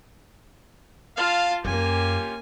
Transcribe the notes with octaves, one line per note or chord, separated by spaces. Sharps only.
F4 F5 A5
F#2 A#3 C#4 F4 G4 G#5